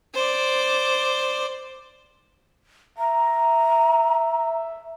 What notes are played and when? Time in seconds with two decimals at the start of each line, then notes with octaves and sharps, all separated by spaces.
0.14 C5 D5
2.98 E5 A#5